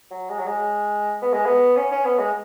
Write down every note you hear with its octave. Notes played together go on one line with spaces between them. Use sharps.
F#3
G#3
F#3
G#3
B3
G#3
B3
C#4
C#4
B3
G#3